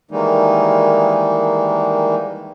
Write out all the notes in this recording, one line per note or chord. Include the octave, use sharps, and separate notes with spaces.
D#3 E3 G3 G#3 A#3 D#4